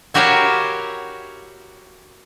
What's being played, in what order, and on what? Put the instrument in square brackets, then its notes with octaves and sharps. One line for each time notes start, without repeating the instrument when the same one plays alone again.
[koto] E4 F#4 G4 A#4 C#5 F5